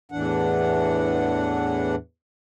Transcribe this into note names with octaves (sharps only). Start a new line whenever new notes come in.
E2 A2 E3 D4 F#5